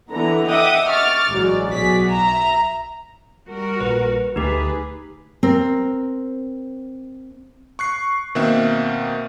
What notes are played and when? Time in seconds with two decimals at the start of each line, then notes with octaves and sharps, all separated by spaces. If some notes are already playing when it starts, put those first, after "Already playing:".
0.10 D3 E3 B3 A#5
0.47 D#5 E5 F#5 G5 D6 D#6
0.87 C#6 D6 F6 A6
1.29 A1 G#2 F#3 D5
1.68 B1 B2 F#4 G#4 D5 B6
2.07 E5 A#5
3.47 G3 F#4 A#4
3.80 A#1 B4
4.36 D2 A3 D#4 G4 G#4 B4
5.43 C4 A#4
7.79 C#6 F#6 C7
8.35 B2 D#3 A#3 C4 E5 F#6